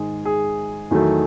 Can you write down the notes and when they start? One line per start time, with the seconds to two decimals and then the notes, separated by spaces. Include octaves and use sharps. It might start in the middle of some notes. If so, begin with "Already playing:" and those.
Already playing: G#2 D#3 G#3 G#4
0.25 G#4
0.91 E2 D#3 F#3 A3